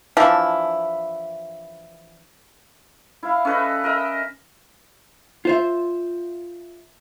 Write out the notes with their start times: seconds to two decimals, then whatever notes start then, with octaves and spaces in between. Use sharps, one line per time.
0.17 E3 F3 D4 E4
3.23 E4 F5
3.45 C#4 A4 B4 D#5
3.84 A#4 D#5 E5
5.45 F4 C5 E5